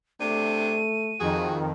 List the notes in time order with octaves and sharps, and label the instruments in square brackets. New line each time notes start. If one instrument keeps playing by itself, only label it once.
[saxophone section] C3 D4 [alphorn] A3 [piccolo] D#7
[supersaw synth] F2 D#3 [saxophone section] F#4 G#4